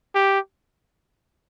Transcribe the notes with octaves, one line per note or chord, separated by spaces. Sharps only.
G4